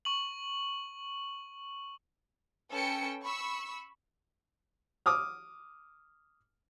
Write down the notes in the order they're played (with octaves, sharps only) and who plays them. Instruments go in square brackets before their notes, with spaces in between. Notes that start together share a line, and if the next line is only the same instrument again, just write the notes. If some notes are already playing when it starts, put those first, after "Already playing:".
[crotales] C#6 F#7
[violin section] C#4 A4 B4 G5 E6 C#7
B5 C#6 E6
[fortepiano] D6 D#6 F6